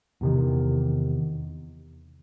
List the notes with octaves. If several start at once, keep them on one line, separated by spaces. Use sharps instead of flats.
E2 C3 D#3